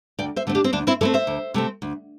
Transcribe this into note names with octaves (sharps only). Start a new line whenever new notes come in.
D2 D5 G5
C5 E5
D3 A3 C4
D4 G4
C4
D2 D4
C4 E4
D3 A3 C4 E4 A4
C5 E5
D2
C3 A3 C4
D2